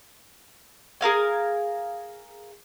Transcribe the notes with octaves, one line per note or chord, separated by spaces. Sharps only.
G#4 A#4 F5 G#5